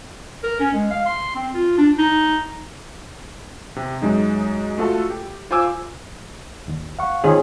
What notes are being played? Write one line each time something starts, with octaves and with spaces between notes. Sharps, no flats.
A#4
C#4
G#3
F5
C6
C4
F4
D4
D#4
C3
F#2 G#3 D#4
A3 F4 F#4 A4
G4
F4 C5 G#5 D6 E6
D#2
F5 F#5 C#6
D#3 C4 F4 G#4 C#5